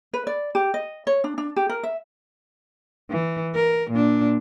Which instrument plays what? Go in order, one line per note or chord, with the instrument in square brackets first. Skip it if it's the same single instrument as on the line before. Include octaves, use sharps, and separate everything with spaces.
[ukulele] B4
D5
G4
D#5
C#5
D4
D4
G4
A#4
E5
[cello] E3
A#4
A#2 D4